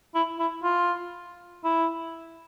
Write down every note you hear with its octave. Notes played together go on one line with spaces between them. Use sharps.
E4
E4
F4
E4